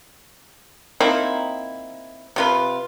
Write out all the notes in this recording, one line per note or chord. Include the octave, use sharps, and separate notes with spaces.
A#3 C4 D#4 E4
C3 F4 B4